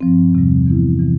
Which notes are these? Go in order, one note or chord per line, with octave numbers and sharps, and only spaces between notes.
G2 F3 C4
E2 C3 G3
E3 B3 E4
C3 E3